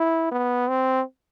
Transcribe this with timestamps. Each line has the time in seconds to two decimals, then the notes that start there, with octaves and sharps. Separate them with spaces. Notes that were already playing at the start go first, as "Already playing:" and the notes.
Already playing: E4
0.31 B3
0.68 C4